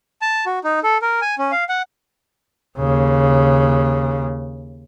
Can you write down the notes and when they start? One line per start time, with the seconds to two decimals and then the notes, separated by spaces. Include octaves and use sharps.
0.22 A5
0.46 F#4
0.64 D#4
0.83 A4
1.02 A#4
1.22 G#5
1.38 C#4
1.52 F5
1.69 F#5
2.78 D#2 C#3